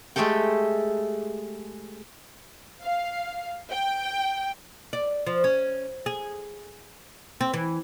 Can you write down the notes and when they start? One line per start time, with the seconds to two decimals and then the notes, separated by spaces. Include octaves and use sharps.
0.16 G#3 A3 G4 A4 G5
2.82 F5
3.70 G5
4.93 D5
5.27 F3
5.44 C#4
6.06 G#4
7.41 C4
7.53 E3